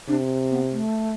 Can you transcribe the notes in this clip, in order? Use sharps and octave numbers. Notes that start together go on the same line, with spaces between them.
C3 D4
B3
A3